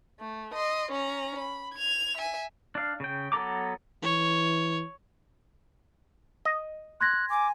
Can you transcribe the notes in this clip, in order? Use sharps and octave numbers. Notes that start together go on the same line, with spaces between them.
A3
D#5 C6
C#4 A#5
B5
G#6 F7
E5 G#5
D4 F5
C#3 G5
F#3 B3 A4 A#5 D6
E3 C#5
D#5
C6 F#6 G#6 A#6
G#5 D6